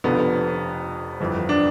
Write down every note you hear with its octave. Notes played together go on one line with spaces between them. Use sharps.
F1 F2 D3 F3 B3
G1 F2 E3
D4